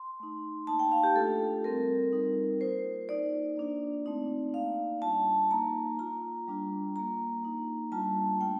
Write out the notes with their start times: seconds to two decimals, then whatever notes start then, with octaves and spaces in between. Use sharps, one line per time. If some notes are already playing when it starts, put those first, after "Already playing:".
Already playing: C6
0.20 A3 D#4
0.67 A#3 D#4 A5
0.79 G5
0.92 F5
1.03 G4
1.16 A3 D4 F4 A4
1.64 G3 C4 F4 A#4
2.13 G3 C4 D#4
2.61 A#3 F4 C5
3.09 A#3 D#4 D5
3.57 A#3 D4 F4
4.06 A3 C4 D#4
4.54 A#3 D#4 F5
5.02 G3 D4 F4 A5
5.51 A#3 D#4 A#5
5.99 A#3 F4 A#5
6.48 G3 D4 F4
6.95 A#3 F4 A#5
7.44 A#3 D#4
7.92 G3 A#3 D4 F4 A5
8.40 A3 D4 F4 G5